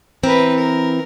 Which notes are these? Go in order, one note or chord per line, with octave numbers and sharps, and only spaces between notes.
E3 C4 A#4 B4
A#4